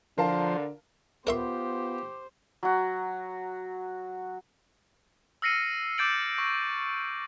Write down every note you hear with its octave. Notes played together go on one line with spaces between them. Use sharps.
D3 F3 A#4 C5 F5 A5
B3 F4 G4 A#4 C5 E5 C6
F#3 F#4
E6 F6 A#6 C7 C#7 D#7
D6 G6 A6 D7 F#7
C#6 A#6